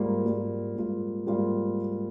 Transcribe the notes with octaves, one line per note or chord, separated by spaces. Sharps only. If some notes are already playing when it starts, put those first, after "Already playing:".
Already playing: G#2 G3 A#3 F4
G#2 G3 A#3 F4
G#2 G3 A#3 F4
G#2 G3 A#3 F4